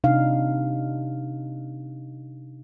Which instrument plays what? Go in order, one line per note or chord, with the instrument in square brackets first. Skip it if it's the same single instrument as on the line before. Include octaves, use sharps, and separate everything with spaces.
[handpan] C3 D4 D#4 F5